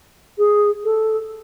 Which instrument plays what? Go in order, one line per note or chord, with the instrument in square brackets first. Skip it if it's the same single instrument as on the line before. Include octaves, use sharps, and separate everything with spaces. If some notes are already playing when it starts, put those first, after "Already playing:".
[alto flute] G#4
A4